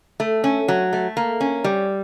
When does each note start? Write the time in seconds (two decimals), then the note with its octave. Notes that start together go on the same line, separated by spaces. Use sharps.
0.20 A3
0.44 C#4
0.68 F#3
0.93 A3
1.17 A#3
1.41 C#4
1.64 G3